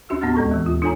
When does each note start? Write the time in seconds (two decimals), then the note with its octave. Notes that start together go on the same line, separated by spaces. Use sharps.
0.09 D#2 C#4 D4 F#4 E5 E6
0.21 A2 B3 C#4 F#5 F6 A6
0.35 D2 G#3 B3 A4 A#5 C#6
0.51 D#2 E3
0.66 F4
0.82 D4 F4 A4 C#5 G#5 A#5